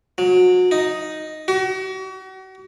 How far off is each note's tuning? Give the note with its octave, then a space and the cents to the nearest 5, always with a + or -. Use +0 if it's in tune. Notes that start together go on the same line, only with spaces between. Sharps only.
F#3 -30
D#4 +0
F#4 +40